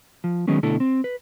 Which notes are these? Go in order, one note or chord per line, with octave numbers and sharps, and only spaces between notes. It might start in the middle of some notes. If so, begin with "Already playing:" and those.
F3
D#3 F#3 G#3 B3 C#4
B2 D3 A3 E4 A4
C4
B4